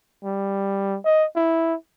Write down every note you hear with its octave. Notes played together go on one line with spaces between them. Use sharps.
G3
D#5
E4